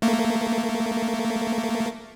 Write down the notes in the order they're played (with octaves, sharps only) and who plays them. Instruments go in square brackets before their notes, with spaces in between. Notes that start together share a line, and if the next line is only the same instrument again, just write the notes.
[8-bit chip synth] A3 A#3